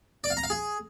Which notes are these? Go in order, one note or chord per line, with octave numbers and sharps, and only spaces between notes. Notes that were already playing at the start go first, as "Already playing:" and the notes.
D5
F5
A#5
F5
G#4